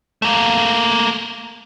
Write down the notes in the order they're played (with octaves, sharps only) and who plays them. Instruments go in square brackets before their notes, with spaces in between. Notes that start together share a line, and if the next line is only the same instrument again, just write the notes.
[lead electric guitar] A3 A#3